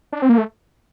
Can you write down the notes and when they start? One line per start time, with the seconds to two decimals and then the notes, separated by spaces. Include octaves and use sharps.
0.13 D4
0.22 C4
0.29 A#3
0.38 A3